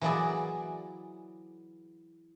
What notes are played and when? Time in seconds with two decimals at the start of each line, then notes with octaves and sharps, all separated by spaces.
0.01 E3 F#3 A#3 E4 G#4 D5